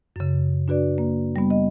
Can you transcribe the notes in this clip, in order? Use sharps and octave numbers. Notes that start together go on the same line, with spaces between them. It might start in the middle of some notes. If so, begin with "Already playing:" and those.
F#2 C#3
D4 F#4 B4 D5
A#3
G3 B3
D#5